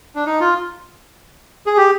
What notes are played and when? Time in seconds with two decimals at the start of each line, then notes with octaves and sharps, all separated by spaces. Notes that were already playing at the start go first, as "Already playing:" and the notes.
0.15 D4
0.26 D#4
0.40 F4
1.66 G#4
1.77 G4